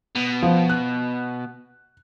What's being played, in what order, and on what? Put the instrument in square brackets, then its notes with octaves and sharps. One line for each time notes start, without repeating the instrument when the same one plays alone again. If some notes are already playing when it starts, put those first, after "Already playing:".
[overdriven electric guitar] B2
[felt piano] F3
F#6